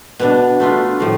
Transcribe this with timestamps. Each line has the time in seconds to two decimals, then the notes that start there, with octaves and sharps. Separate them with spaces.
0.19 B2 B3 D4
0.60 A3 D4 F4 B4
1.00 A2 F3 A3